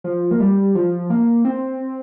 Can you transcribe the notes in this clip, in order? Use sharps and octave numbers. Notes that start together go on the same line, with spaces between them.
F3
A#3
G3
F3
A#3
C4